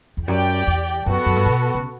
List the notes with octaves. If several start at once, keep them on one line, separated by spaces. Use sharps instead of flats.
E2
F#2 G4 D5 G5
E2
F#2 B3 F#4 A4
F#2
G2
B2
C#3